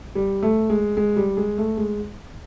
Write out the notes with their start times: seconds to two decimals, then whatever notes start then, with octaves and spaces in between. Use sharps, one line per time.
0.15 G3
0.43 A3
0.70 G#3
0.97 G#3
1.16 G3
1.37 G#3
1.58 A3
1.77 G#3